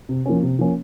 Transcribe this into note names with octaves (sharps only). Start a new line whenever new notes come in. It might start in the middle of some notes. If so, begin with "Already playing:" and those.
C3
F3 A#3 C#4
C3
F3 A#3 C#4